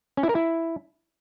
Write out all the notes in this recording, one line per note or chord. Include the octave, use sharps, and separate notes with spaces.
C#4
E4
A#4
E4